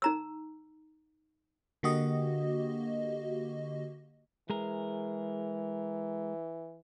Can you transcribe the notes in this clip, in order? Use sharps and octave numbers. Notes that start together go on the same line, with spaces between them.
D#4 A#5 E6
D3 A#3 F#4 G4 D#5
E3 G#3 G#4 A#4